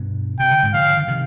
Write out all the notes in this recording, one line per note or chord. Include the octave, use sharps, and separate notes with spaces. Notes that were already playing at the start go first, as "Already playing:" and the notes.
Already playing: G2 B2
C3 G5
D3
G#2 C3
D3 F3 F5
D3
C3 D#3